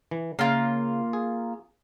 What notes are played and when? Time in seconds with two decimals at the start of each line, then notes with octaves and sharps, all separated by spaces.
0.11 E3
0.39 C#3 A#3 F4
1.13 G#4